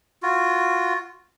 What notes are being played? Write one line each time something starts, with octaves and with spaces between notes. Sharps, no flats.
F4 F#4